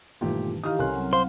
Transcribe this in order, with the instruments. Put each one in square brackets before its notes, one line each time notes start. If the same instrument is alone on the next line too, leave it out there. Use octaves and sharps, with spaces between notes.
[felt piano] G1 D#3 E3 [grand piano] A#2 A3 G4
[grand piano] D#3 E3 D#4 [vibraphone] G4 D#5 F5 [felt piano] D#6 F6
[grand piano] C2 C6 F#6 [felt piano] C#4 A4 A#4 [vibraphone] G#5
[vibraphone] F#3 C4 F#5
[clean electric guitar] C5 [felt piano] F5